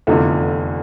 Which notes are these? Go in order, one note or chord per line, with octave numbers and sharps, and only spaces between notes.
F1 E2 D3 F4 A4